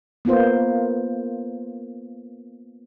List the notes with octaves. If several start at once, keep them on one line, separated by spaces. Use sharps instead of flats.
A#3 B3 F4 C5